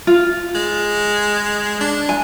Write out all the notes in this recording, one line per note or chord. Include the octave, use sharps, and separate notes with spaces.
F4
G#3
D4
G#5